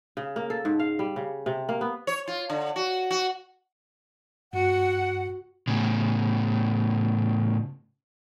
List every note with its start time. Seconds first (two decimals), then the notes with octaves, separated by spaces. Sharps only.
0.17 C#3
0.36 A#3
0.50 A4
0.65 G#2
0.79 F5
0.99 G3
1.16 C#3
1.46 C3
1.69 A#3
1.81 B3
2.07 C#5
2.28 F4
2.50 D3
2.76 F#4
3.10 F#4
4.53 G2 F#4 F#5
5.68 A2 C#3